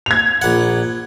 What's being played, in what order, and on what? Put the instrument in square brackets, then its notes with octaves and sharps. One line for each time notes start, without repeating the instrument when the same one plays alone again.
[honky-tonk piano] G#6 F7
[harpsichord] A#1 F#5